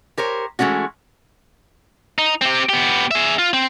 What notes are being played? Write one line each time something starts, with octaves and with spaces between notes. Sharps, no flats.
G4 A#4 C5 C#5
E3 G#3 A3 C#4 F#4
D#4
C4 G4
B3 G4
G#4 E5
F4
C4